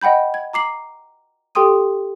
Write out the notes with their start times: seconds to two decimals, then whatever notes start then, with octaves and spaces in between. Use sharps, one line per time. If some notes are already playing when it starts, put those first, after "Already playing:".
0.01 D#5 F#5 G5 B5 G6
0.34 G#6
0.53 A#5 D6 C7 F#7
1.55 G4 A4 G5 C6 D#6 D#7